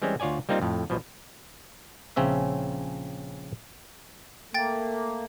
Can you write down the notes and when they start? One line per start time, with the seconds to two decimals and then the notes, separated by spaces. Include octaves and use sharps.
0.02 E3 G3 G#3 C4 C#4
0.20 D2 F4 C#5 D5 G#5
0.49 G3 A#3 C4 D#4 F4
0.62 F2 A2
0.90 B1 B2 F3
2.16 A#1 C#3 C4 C#4 E5
4.54 A3 A#3 G5 A6